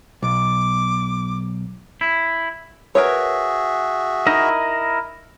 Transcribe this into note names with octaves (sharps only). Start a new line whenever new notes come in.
B1 D6
E4
F#4 G#4 A#4 B4 C#5 E5
D#4 E4 A#4 D#5